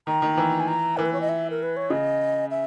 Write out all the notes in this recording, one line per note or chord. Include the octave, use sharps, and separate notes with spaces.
D#3 A#5
D#3
E3
G#5
A#5
E3 A#4
B4
C#5
D#5
E5
A#4
B4
C#5
C#3 D#5
E5